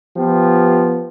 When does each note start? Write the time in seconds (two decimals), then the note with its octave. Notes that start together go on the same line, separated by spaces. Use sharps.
0.17 F3 B3 F4 G4